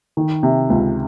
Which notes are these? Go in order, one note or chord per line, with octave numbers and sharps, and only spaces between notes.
D#3
C3
C#2